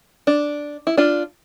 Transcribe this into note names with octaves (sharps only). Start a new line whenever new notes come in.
D4
E4
D4 F4